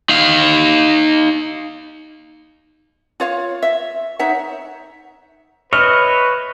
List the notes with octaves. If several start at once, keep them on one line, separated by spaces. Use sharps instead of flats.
D#4 F5
F4 C#5 F5
E5
D#4 C#5 E5 F#5
B4 C#5 D#5 E5 F6